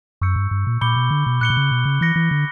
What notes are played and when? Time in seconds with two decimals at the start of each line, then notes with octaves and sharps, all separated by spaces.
0.21 F#2 C#6 E6 G6 C#7
0.36 G2
0.51 G2
0.67 A#2
0.81 A#2 B5 D6 G6 C#7 G7
0.96 B2
1.11 D3
1.26 B2
1.41 A#2 F#6 C#7 G7
1.50 B2
1.57 C#3
1.71 B2
1.85 C#3
2.01 E3 F#6 A#6 C#7
2.16 E3
2.31 D3